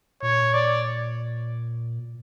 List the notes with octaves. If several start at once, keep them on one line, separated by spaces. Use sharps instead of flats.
A#2 C#5
D5